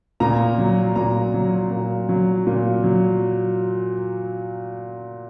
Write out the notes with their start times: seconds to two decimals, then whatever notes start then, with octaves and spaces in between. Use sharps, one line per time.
0.20 A#2 A#5
0.58 F#3
0.96 A#2 A#5
1.34 F#3
1.71 A#2
2.09 F#3
2.47 A#2
2.84 F#3